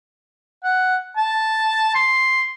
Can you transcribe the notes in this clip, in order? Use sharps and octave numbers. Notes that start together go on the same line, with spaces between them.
F#5
A5
C6